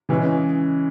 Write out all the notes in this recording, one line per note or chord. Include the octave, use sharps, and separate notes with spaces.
C#3 E3 G#3 C#4